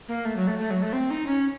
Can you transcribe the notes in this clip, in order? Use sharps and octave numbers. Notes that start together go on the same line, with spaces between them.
A#3
A3
F#3
A3
A3
F#3
A3
C4
D#4
C#4